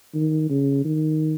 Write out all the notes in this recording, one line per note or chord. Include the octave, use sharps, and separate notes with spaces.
D#3
C#3
D#3